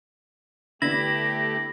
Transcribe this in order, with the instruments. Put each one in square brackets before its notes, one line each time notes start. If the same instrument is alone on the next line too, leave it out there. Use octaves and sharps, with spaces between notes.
[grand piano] D3 B3 D4 [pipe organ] A3 G4 [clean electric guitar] E4 [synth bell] A#6